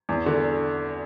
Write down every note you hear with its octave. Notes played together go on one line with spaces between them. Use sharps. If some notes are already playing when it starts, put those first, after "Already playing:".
E2
D3